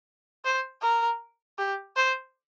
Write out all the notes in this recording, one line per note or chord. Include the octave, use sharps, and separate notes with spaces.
C5
A#4
G4
C5